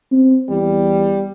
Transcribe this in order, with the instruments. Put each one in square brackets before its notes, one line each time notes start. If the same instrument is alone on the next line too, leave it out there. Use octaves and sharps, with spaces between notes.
[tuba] C4
[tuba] E2 [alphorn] G3